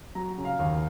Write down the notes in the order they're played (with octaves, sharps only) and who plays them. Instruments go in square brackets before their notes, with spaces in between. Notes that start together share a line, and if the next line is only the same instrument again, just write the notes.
[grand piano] F#3 A#5
C#3
F5
D#2